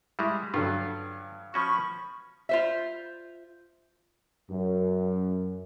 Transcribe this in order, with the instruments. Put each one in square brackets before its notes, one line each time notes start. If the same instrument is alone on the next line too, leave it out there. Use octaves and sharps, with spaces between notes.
[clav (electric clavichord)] G3 G#3 [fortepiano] E4 C#6
[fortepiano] G2 D3 F#3 [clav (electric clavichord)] F4
[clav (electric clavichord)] F3 C#4 F#4 [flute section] B5 C#6
[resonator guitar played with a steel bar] F4 C5 E5
[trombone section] F#2